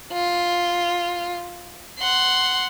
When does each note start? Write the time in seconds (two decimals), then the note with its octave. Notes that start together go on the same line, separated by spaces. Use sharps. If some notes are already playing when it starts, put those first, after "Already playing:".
0.13 F4
1.99 F#5 C6